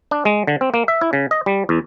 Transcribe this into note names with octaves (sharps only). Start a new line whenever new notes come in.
D4
G#3
D3
C4
A#3
E5
E4
C#3
D#5
G3
E2